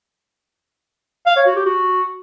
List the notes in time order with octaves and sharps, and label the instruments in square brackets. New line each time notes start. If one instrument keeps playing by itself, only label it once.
[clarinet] F5
C#5
F#4
G4
F#4